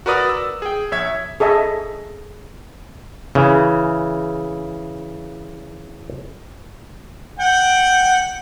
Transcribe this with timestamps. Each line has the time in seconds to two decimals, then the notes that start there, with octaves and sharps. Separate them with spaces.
0.06 F#4 A#4 B4 D5 D#6
0.29 E6
0.62 G#4 G5
0.91 A#1 C#5 E5 G#6
1.40 G#4 A4 D#5 E5
3.35 C#3 E3
7.39 F#5 G5